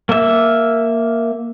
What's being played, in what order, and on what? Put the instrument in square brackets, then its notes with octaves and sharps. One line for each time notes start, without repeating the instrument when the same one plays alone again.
[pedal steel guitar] A#3 E5